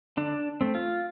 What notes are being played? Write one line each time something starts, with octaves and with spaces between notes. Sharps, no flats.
D3 D4
A3 C4
F4